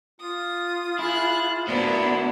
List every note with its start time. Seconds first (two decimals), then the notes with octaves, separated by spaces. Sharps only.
0.20 F4 D#6
0.99 E4 G#4 F#6
1.68 A#3 B3 D4 E4 F#4 C5